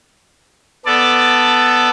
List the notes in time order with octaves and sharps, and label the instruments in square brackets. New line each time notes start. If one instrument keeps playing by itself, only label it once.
[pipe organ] B3 A4 D5